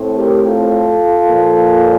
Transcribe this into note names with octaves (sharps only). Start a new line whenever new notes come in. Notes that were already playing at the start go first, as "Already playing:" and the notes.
Already playing: A2 A3 C4
G4 A#4
F4 A4
A#2 F3 A#3